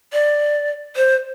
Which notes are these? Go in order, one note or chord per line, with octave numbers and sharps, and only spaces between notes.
D5
C5